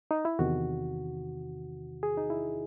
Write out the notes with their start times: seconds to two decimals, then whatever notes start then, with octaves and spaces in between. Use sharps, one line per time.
0.11 D#4
0.25 E4
0.39 E2 C3 D#3 F#4
2.03 G#4
2.18 D#4
2.30 E4